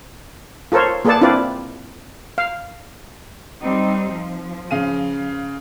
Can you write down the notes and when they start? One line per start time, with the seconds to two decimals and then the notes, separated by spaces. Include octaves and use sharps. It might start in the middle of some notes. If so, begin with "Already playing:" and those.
0.72 F4 A4 A#4 C5 C#5
1.05 A#3 G#4 A4 B4 D5 A5
1.21 C4 D4 E4 F4 B4 D5
2.38 F5
3.61 G3 C4 D#4
4.11 F3
4.71 C#3 F5 D#7